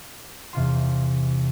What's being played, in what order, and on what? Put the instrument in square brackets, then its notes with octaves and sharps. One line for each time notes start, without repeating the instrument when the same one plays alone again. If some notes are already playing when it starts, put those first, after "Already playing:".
[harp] E2 C3 F4 C6